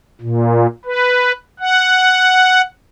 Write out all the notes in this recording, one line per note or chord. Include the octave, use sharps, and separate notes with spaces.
A#2
B4
F#5